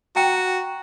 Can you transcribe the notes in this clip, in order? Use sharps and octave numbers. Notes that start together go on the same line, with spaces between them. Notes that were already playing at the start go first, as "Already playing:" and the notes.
F#4 G5 A#5